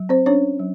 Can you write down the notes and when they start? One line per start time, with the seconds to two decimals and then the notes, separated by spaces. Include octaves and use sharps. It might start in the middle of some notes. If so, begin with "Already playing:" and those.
Already playing: F#3
0.09 C4 C5
0.26 C#4 D4 C#5
0.59 F#3